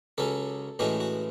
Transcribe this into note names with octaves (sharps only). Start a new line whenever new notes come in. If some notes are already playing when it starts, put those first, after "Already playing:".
C#2 C#3 F#3 C#4 A4
A1 A2 E3 G#3 C#4 F#4
F#4